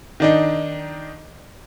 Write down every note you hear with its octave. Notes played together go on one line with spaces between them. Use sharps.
D#3 D4 D#4